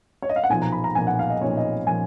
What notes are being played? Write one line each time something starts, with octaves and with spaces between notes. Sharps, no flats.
C#5
D#5
F5
F#5
B1 A#2 F3 G#5
A#5
B5
A#5
B1 A#2 F3 G#5
F#5
F5
D#5
B1 A#2 F3 C#5
D#5
A#2 F3 G#5